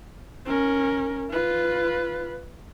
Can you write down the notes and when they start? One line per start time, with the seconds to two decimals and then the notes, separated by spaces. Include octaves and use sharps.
0.45 C#4 A#4
1.30 F4 B4